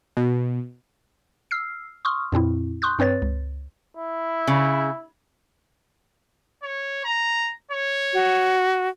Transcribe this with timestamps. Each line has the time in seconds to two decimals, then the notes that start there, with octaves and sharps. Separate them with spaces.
0.17 B2
1.51 E6 F6 C7
2.05 C6 C#6 D#6 F6
2.32 F2 A#2 C4 E4
2.82 C6 C#6 D#6 F#6 G6
2.99 G2 C4 B4 C#5 A6
3.22 C#2
3.97 E4
4.47 C#3
6.63 C#5
7.05 A#5
7.71 C#5
8.13 F#4